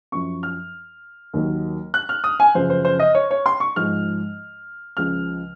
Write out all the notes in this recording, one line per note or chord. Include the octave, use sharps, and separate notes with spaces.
F#2 F3 C#6
F6
D#2 D#3 F#3
F#6
F6
D#6
G#5
F#2 C#3 F3 C5
C5
C5
D#5
C#5
C#5
C6
C#6
G#2 F3 F6
C#2 C#3 F3 F6